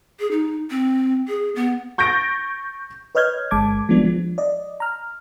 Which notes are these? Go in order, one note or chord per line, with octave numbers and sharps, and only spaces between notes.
G#4
D#4
C4
G#4
B3
C#6 G6 A6 A#6 D7
B4 C#5 D#5 F6 G6 G#6
G1 G#3 A5 D6 G#6
F3 G3 G#3 B3 D4
F3
D5 D#5
A#5 F6